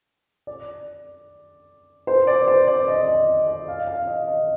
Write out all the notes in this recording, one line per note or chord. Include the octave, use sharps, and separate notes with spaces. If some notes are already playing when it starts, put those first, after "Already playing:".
D5
C5
D5
C5
D5
D#5
D#5
D#5
F5
F5
D#5
D#5